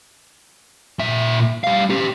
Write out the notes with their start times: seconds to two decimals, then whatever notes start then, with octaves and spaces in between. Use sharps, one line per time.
0.99 A#2 E5
1.64 G3 F5
1.90 C#4 G4